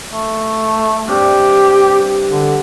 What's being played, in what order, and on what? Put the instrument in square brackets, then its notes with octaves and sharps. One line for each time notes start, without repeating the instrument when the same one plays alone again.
[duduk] A3
[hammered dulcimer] G2 C3 [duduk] G4
[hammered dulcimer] D5
[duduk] D3